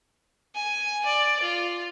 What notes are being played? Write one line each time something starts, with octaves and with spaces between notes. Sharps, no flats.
G#5
D5
F4